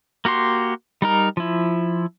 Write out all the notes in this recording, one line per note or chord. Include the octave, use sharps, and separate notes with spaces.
A#3 F#4 G4 C6
G3 D#4 A#4
F3 E4